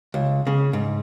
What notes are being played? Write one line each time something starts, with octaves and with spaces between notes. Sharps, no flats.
C#2
C#3
G#2